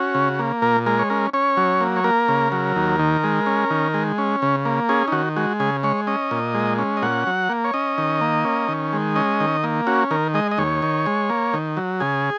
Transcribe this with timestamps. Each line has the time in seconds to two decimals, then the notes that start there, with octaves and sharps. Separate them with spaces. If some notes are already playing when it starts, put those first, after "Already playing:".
Already playing: C#4 F#4
0.14 C#3
0.39 A#3
0.62 A#2 A#4
0.86 G#3 A#4
0.99 C#5
1.10 C#4 A#4
1.34 C#4 C#5
1.57 F#3
1.81 A#3
1.96 C#5
2.04 A#3 A#4
2.28 C#3
2.52 F#3
2.76 D#2
2.99 D#3
3.24 G#3
3.46 C#4
3.70 D#3
3.94 G#3
4.18 C#4
4.42 C#3
4.65 A#3
4.89 C#4 G#4
5.08 D#4
5.12 D#3 F#4
5.36 G#3 F#4
5.60 C#3 G#4
5.83 G#3 C#5
6.07 C#4 D#5
6.31 A#2
6.54 G#3
6.79 C#4
6.97 D#5
7.02 A#2 F#5
7.27 F#3
7.49 A#3
7.64 C#5
7.74 C#4 D#5
7.98 D#3
8.21 A#3
8.45 C#4
8.68 D#3
8.93 G#3
9.15 C#4 D#5
9.40 D#3
9.64 A#3
9.87 C#4 F#4
10.11 D#3 A#4
10.34 G#3 D#5
10.51 D#5
10.58 D#2 C#5
10.82 D#3
11.06 G#3
11.30 A#3
11.54 D#3
11.77 F#3
12.00 C#3 G#4